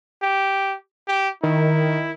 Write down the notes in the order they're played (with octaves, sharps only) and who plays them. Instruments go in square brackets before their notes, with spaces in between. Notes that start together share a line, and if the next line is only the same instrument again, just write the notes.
[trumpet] G4
G4
[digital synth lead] D#3 [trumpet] E4